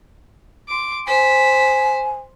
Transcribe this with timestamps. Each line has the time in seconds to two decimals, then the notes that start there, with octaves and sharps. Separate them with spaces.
0.68 C6 D6
1.07 C5 G#5 B6